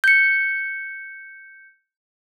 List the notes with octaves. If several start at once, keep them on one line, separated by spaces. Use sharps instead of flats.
G6 C#7